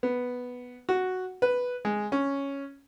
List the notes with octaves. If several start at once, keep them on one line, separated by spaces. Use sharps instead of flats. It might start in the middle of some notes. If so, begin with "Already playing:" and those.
B3
F#4
B4
G#3
C#4